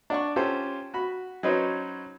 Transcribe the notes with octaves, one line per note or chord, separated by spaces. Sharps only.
D4 F#5 C#6
C#4 F4 G4 A4 C5
F#4 B5
F#3 C#4 D#4 B4 C5